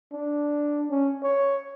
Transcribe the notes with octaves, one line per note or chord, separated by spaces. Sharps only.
D4
C#4
C#5